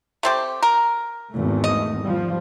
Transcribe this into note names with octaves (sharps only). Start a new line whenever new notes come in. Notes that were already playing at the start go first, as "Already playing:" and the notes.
A3 C4 G4
A#4
G#1 E2 A3
D#5
F3 G3